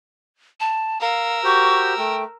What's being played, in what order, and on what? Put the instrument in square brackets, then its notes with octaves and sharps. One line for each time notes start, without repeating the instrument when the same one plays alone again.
[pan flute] A5
[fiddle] A#4 E6 [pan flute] F5
[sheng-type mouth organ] F#4 G4 C5 [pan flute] C#6
[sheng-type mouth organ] A3 [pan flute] G5